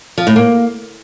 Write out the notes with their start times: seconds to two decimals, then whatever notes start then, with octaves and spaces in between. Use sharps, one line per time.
0.18 F3
0.27 A2
0.36 A#3